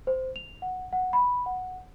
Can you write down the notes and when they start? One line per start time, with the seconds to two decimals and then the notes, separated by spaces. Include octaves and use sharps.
0.07 C5
0.36 F7
0.62 F#5
0.93 F#5
1.13 B5
1.46 F#5